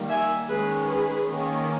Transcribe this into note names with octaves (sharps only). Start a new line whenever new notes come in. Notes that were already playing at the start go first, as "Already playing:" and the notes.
Already playing: D#3 G3 A#3
E5 G#5
D#3 G#3 C#4 G#4 B4
G#4 B4
D#3 A#3 C#4